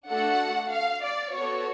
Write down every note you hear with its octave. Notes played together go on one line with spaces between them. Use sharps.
A3 D4 F#4 A4 F#5
F5
D5
B3 F#4 A4 C#5